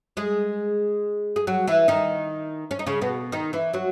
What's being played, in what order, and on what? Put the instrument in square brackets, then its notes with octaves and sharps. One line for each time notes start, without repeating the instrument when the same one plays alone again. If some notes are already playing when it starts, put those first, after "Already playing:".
[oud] G#3 G#4
G#4
F#3 F#4
E3 E4
D#3 D#4
C#4
D#4
C#3 C#4
B2 B3
D#3 D#4
E3 E4
F#3 F#4